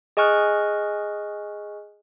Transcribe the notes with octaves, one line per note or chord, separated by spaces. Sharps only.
G#4 D#5 G#5 C#6 F6 F#6